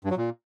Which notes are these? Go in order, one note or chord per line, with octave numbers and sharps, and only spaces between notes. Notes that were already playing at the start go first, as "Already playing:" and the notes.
G2
F#3
A#2